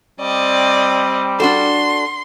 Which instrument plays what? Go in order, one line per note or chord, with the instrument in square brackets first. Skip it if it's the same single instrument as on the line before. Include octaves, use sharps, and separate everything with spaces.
[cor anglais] G3 [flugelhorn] C4 [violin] D5 D#5
[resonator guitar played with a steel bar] D4 F#4 A4 [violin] C6